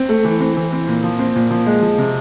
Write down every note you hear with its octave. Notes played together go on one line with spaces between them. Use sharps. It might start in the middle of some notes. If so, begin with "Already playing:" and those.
Already playing: C4
A3
E3
C4
E3
C4
A#2
F3
C4
A#2
F3
G#3
F3
C3